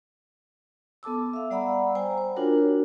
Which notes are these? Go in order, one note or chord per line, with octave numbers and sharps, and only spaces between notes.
B3 A4 A5 D6 E6
E5 F5
G3 D5 F#5 A#5 B5 E6
C5 G5 G#5 A#5
C5
D4 F4 F#4 A#4 C#5